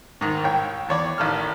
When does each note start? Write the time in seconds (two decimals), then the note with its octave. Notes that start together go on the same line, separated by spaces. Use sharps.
0.21 G#2 D#3
0.44 C2 C#5 G5
0.89 E2 C#5 D5
1.18 A1 D#3 A4 F6